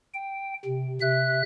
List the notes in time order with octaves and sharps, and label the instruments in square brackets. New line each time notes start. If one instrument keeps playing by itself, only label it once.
[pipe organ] G5
C3
C3 E5 F#6